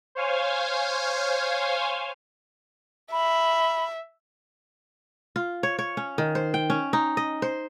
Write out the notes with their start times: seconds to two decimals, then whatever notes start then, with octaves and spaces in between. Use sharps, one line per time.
0.15 C5 C#5 F5 G#5
3.12 E5 B5
5.36 F4
5.63 C#5
5.79 C#5
5.97 C#4
6.18 D#3
6.35 C5
6.54 G5
6.70 C#4
6.93 D#4
7.17 D#5
7.42 C5